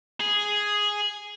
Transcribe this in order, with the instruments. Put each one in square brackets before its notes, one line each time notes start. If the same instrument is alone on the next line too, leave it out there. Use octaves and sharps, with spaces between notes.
[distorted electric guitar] G#4